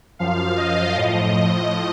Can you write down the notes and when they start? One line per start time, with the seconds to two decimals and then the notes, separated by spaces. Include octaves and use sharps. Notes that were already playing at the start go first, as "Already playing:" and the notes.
0.19 F#2 F3 F5
0.57 D#5
0.94 A2 F3 D#5